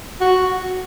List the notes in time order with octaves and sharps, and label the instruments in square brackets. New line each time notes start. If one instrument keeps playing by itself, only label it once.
[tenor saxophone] F#4